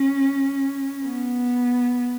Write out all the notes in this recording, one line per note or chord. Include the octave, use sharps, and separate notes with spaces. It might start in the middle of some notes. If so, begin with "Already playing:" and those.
Already playing: C#4
B3